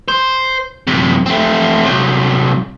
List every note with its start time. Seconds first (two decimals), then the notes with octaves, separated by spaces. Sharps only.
0.08 C5
0.87 F#2 C3
1.26 A3 C4
1.84 C2 F#3